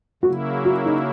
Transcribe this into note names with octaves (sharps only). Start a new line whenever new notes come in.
C#3 F#3 A#3 E4 F#4
F#4
D#4